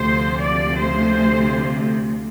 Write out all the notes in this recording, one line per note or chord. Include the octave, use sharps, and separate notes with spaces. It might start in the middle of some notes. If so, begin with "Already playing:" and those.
Already playing: D2 C3 F3 C5
D5
C5